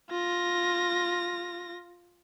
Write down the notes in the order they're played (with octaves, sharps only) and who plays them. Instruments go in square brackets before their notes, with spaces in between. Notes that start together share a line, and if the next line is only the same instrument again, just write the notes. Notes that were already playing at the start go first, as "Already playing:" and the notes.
[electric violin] F4 A#6